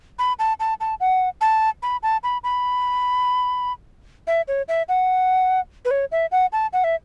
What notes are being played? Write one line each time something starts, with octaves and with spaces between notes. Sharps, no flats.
B5
A5
A5
A5
F#5
A5
B5
A5
B5
B5
E5
C#5
E5
F#5
B4
C#5
E5
F#5
A5
F#5
E5